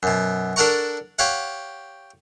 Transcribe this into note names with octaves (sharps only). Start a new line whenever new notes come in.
F#2 B2
D4 A4 A#4 F#5 A#5 C#6
G4 C#5 F5 F#5